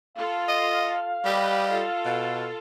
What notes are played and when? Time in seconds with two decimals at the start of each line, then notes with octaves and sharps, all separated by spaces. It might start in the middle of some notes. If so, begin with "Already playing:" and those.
0.17 F4 A4 F5
0.49 D#5
1.25 G3 G4 B4 D#5
1.70 F4 A4
2.05 B2